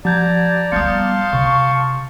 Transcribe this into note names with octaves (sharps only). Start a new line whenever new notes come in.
F3 D5 A5 A#5 G6 G#6
G3 B3 F5 A5 C6 D#6 G6 C#7
C3 C#6